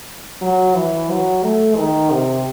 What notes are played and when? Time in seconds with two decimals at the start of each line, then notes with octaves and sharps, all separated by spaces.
0.41 F#3
0.75 E3
1.09 F#3
1.43 A3
1.77 D#3
2.11 C3